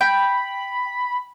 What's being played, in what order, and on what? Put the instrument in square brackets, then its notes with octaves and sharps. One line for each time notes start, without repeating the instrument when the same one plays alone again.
[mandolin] G5 [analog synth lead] B5